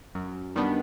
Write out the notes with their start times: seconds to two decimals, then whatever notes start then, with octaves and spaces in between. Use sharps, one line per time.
0.15 F#2
0.56 D#3 G3 B3 D4